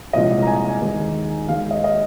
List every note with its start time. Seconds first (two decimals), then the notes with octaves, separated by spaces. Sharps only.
0.13 C2 A#2 F3 G#3 D#5
0.42 A#5
0.47 G#5
0.80 D#2 D#3 G#3
1.48 D#2 D#3 G#3 F5
1.71 D#5
1.84 D#5